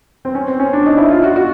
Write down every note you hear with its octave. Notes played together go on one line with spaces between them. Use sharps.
C4
C#4
C4
C#4
D4
D#4
E4
F4
F#4
F#4